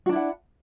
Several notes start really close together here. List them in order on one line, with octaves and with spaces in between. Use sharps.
F#4 D4 E4 F#5